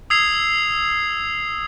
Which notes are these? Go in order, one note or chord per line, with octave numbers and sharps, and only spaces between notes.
D#6 E6 G#6 C7 F7